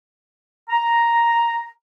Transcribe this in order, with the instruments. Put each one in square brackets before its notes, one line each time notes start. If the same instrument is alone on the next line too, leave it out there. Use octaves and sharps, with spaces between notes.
[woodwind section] A#5